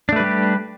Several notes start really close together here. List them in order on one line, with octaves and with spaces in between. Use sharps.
D4 A3 B4 G3 G4